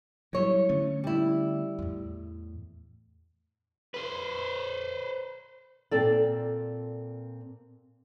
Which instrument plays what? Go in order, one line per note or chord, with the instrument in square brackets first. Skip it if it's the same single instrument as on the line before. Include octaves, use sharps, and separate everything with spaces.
[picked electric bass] F#3 G3 [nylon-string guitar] E4 C#5
[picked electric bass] D3 A3 C#4
[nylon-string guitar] G3 E4
[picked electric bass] E2 A2
[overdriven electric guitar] B4 C5
[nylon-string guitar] A#2 C4 A4 D5